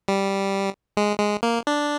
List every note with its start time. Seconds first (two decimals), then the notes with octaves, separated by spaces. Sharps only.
0.08 G3
0.97 G#3
1.19 G#3
1.43 A#3
1.67 D4